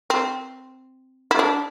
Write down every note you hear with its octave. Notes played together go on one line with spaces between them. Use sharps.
C4
E4
D4